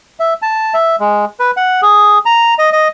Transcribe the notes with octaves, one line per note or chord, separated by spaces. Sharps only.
E5
A5
E5
G#3
B4
F#5
G#4
A#5
D#5
D#5